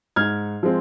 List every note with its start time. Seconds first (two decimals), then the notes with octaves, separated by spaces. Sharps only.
0.16 G#2 F6 G#6
0.63 F3 G#3 C4